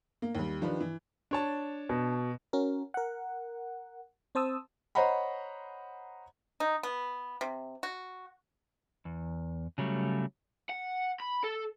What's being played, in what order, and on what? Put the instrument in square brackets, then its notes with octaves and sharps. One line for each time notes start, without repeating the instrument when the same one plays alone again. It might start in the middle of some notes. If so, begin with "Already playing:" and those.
[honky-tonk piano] A#3
D#2 G3
D#3 F3 D4 G4 B4
E3
[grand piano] D4 C#5 A5
[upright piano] B2
[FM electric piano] C#4 F#4 A#4
A#4 F#5
C4 C5 A5 D#6 E6
[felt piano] C5 C#5 D#5 F#5 A#5 B5
[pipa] D#4
B3
C3
F#4
[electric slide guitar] E2
C#3 F#3 G3 A3
[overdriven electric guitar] F#5
B5
A4